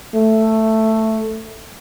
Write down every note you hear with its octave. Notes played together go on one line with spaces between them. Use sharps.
A3